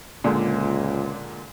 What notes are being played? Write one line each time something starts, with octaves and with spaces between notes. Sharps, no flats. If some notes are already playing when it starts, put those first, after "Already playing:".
C#2 A#2 D3 G#3